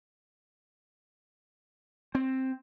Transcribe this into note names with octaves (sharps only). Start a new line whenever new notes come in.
C4